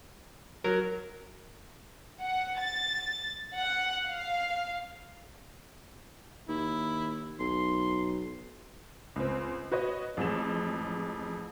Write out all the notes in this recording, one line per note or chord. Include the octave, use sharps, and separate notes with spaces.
F#3 A#4
F#5
A6
F#5
F5
D#2 E4
B1 C6
C#2 C4
F#4 B4 C#5 D#5
A1 F2 G#3 E7